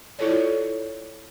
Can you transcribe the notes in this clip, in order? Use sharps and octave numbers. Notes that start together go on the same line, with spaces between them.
E4 F4 A4 C#5 D5